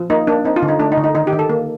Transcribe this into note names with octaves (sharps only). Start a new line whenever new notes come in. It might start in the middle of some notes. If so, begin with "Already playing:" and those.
Already playing: F3
A#3 D#4
A#3 D4
C4 D#4
F4
D3
D#4
A3 D4
D#4
D3
D#4
D#3 D#4
G4
D#3
A4
A#3